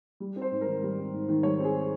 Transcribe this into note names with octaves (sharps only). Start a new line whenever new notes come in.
G3
C4
C5
G#2
A#4
D#3
G3
C4
G#2
D#3
G3 C#5
C4 G#4